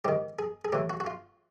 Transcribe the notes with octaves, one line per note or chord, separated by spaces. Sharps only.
G#2 D#3 G4
G#4
G#4
A2 E3 G4
F#4
F#4
F4